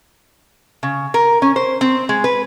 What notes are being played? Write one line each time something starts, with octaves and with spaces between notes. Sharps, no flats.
C#3
A#4
C#4
C5
C4
G#3
B4